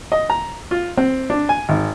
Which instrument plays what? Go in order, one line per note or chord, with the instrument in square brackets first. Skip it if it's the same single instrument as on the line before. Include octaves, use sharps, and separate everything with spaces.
[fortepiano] D#5
A#5
F4
C4
D4
G#5
G#1